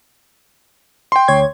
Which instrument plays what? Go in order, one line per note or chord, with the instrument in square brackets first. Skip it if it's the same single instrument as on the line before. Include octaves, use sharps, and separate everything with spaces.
[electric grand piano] G5 C6
[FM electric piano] D2 C#5 G#6